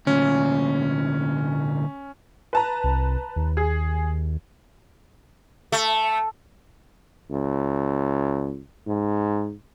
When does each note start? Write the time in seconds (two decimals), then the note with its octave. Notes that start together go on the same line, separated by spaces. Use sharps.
0.07 D2 A#2 C#4
2.53 B4 A5 A#5
2.84 C2
3.36 D#2
3.57 G#4
5.72 A3
7.31 C#2
8.87 G#2